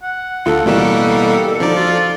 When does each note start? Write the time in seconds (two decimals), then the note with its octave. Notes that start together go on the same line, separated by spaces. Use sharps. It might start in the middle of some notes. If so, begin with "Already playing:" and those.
0.03 F#5
0.46 D2 F4 A4 F5 A5
0.66 A1 B2 E3 G3 A#3 E7
1.60 D3 F3 D#4 D5
1.76 F4 F#4